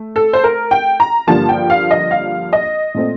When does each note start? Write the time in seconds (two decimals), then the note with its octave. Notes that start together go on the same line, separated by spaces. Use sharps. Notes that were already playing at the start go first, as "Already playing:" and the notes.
Already playing: A3
0.16 A4
0.33 C5
0.44 A#4
0.71 G5
1.00 A#5
1.27 G2 D3 F3 A#3 A5
1.49 G5
1.70 F5
1.91 D#5
2.11 F5
2.53 D#5
2.94 A#2 A3 C4